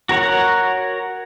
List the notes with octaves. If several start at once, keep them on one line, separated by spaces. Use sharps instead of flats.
F#4 A#4 C#5 F#5